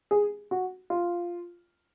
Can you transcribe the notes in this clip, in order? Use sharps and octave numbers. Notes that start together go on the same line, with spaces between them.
G#4
F#4
F4